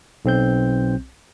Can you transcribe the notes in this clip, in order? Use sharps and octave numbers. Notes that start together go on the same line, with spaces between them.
B1 C4 G6